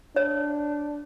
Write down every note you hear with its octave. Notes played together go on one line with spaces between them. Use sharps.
D4 C#5